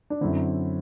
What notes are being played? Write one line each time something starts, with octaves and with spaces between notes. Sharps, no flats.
D4
F#2 D3 C4 E4